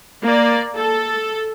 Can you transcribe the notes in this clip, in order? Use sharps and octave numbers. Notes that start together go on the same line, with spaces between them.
A#3 D5
A4